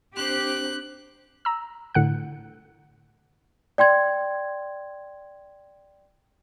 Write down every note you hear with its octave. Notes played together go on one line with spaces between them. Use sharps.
C4 D4 G4 C5 F#6
A#5 E6
A2 D3 F#5 F#6
D5 G5 C6 G#6